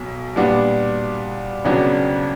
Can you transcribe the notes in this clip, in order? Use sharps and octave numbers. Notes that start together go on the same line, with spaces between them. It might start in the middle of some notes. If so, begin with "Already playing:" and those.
Already playing: B1 B2
A#2 G3 B3 D4
F2 C#3 F#3 B3 D4